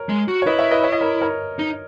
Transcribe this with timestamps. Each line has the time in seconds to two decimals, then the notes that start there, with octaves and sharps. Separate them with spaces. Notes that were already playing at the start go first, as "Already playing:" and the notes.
Already playing: A#4 C#5
0.09 G#3
0.28 F#4
0.42 C#5
0.46 E4 B4 D#5
0.59 C#5 E5
0.71 B4 D#5
0.84 C#5
0.92 D#5
1.01 A#4 C#5
1.21 A#4 C#5
1.59 D#4